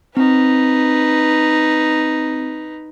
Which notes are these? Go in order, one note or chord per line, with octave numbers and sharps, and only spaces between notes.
C4 D#4 B4